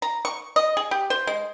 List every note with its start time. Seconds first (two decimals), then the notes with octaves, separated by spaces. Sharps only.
0.02 A#5
0.25 C#6
0.56 D#5
0.77 G#4
0.91 G4
1.10 C5
1.27 G#3